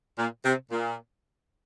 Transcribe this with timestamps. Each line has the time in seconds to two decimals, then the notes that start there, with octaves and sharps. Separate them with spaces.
0.19 A#2
0.45 C3
0.71 A#2